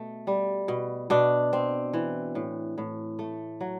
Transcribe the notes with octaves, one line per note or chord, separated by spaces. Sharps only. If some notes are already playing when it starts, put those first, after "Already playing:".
Already playing: B2 A3
G3
B2
B2 D4
C4
E3
A2
A2
A3
F#3